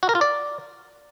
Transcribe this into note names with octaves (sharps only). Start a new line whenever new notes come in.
F#4
A#4
F4
D5